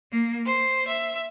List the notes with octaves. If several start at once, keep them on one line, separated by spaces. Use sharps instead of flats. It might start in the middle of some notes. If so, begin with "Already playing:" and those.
A#3
C5
E5